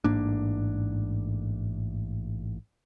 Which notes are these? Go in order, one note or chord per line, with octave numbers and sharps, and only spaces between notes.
A1 G#2 A#3 D4